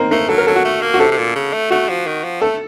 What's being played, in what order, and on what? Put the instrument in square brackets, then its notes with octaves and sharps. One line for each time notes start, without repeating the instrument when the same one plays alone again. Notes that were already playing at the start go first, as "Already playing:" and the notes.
Already playing: [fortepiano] A#3 C4 D#4
[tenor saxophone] A3 [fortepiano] A#3
[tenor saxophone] F#3 [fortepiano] A4
[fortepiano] A#4
[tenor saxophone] F#3 [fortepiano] A4
[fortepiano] F#4
[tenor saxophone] A3
A#3
[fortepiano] F#4
[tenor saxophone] C3 [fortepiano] A4
[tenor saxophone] C3
A#2
C#3
A3
[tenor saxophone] A3 [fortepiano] F#4
[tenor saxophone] F3
D#3
F3
[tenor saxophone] A3 [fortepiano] A4